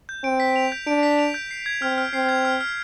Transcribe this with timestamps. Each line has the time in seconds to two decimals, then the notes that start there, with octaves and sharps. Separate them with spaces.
0.09 G6
0.24 C4 D7
0.40 B6
0.56 F7
0.72 G6
0.87 D4 D7
1.03 B6
1.19 F7
1.34 G6
1.51 C7
1.66 G#6
1.82 C4 F6
1.98 F6
2.13 C4 C7
2.29 G#6
2.45 F6
2.61 F6